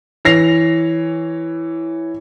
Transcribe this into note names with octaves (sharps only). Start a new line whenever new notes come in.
E3 C#5 A#6 C7 F7